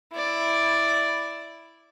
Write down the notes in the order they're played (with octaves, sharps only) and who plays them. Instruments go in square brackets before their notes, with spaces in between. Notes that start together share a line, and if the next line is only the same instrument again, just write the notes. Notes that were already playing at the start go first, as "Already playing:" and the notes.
[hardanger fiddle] E4 D5